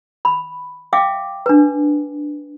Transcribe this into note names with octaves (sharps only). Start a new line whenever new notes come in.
B5
E5 F5 G5 D6
D4 B4